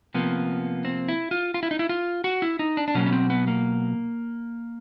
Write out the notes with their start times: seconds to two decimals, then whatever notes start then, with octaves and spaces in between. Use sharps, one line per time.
0.14 C3 F3 A#3 B3
0.85 C4
1.08 E4
1.31 F4
1.54 F4
1.63 E4
1.71 D#4
1.79 E4
1.89 F4
2.24 F#4
2.42 E4
2.59 D#4
2.77 D4
2.88 D4
2.95 B2 F#3 A#3 C#4
3.06 B3
3.12 C4
3.30 B3
3.47 A#3